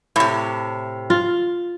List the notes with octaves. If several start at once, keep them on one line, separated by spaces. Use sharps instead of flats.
A2 C3
F4